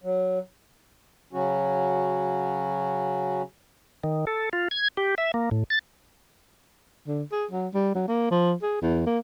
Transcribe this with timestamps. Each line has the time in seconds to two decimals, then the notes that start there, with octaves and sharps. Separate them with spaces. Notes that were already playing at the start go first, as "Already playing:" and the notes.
0.04 F#3
1.33 C#3 F#3 C#4 F#4
4.04 D#3
4.27 A4
4.53 F4
4.71 G#6
4.97 G4
5.18 E5
5.34 A#3
5.51 A2
5.70 A6
7.08 D3
7.32 G#4
7.51 F#3
7.74 G3
7.95 F#3
8.08 A#3
8.31 F3
8.62 G#4
8.82 E2
9.06 A#3